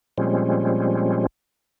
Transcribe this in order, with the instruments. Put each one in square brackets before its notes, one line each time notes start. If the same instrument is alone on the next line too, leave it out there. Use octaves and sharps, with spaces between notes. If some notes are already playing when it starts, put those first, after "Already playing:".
[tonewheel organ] A#2 F3 G3 G#3 C4 C#4